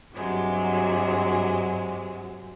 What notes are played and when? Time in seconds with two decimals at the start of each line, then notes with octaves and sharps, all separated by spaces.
0.13 G2 C3 F#3 G#3